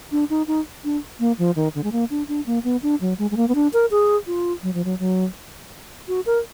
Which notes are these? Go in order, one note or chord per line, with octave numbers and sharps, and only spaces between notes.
D4
D#4
D#4
D4
A#3
F3
D#3
D3
G#3
A#3
D4
D4
A#3
B3
D4
F#3
G#3
G#3
A#3
B3
D4
A#4
G#4
F4
F#3
F3
F#3
F#3
F#4
A#4